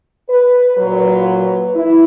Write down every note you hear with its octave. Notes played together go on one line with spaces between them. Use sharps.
B4
A#2 F#3 B4
E4